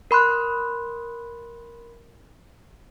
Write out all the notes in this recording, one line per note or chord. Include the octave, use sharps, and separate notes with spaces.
A#4 B5 C6 F#6